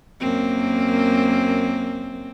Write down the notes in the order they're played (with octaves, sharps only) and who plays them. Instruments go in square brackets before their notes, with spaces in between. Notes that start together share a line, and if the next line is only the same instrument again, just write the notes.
[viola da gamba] F#2 A#3 C4